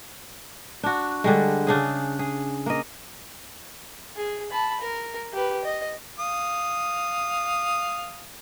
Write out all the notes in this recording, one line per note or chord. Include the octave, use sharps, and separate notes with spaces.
D4 F#4
D3 G3 G#3
C#3 D4 G#4
G#4
A#3 D#5
G#4
A5 B5
A#4
G4 B4
D#5
F5 D#6